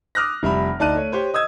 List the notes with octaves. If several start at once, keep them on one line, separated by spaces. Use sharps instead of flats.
D6 D#6 F6 F#6 A#6
F1 G3 E5 B5
D2 D#4 D5 A5 F#6 D#7
A3 C#5
G4 C5 C#5
D#5 D#6 E6 G#6